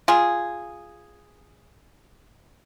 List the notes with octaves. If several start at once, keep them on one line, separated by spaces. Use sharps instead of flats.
F4 G#4